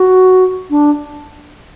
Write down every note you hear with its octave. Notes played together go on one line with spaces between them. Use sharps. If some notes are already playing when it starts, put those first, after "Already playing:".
Already playing: F#4
D4